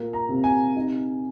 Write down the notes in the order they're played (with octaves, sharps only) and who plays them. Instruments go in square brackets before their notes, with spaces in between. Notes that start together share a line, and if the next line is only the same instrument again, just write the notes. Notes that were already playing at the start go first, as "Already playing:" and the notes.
Already playing: [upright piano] A#2 A#3
A#5
C3
G#5
D#4